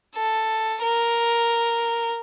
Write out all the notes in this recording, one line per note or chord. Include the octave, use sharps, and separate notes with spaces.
A4
A#4